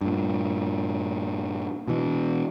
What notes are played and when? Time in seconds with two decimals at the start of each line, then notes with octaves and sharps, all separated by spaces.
0.01 G2 A#2
1.88 B2 E3